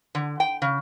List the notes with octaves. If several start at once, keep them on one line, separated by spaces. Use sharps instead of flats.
D3
G5
C#3